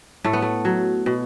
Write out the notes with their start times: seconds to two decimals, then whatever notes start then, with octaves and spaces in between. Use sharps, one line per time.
0.24 A2 A3
0.33 B3
0.42 A3
0.65 F#3
1.06 B2